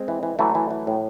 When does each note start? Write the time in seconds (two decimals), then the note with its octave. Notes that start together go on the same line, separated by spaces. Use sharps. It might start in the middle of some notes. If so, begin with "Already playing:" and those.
Already playing: G#3 C4
0.08 E3
0.23 E3
0.39 E3 F#3 A3
0.55 E3
0.71 E3
0.87 A2